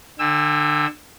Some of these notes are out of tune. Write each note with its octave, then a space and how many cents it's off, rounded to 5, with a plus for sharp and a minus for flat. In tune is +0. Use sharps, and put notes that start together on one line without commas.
D3 +30 G#5 -45 E6 +0